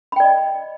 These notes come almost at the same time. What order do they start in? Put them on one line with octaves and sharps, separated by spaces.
B5 G5 D5 D#5